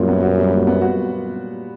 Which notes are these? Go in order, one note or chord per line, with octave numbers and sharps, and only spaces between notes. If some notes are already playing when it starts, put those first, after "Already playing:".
Already playing: F#2 A#2 G3
B3
F#4
G3
A#2
B3
F#4